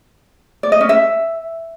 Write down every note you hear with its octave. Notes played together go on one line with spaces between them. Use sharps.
D5
D#5
C#4
E5